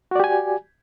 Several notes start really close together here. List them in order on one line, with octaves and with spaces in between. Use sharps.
F#4 D5 G4 G#5